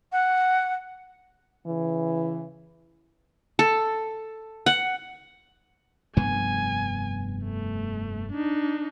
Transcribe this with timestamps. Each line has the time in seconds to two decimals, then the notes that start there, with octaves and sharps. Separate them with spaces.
0.12 F#5
1.66 C#3 E3
3.59 A4
4.66 F#5
6.17 F1 G2 B3 G#5
7.45 A3
8.33 D4 D#4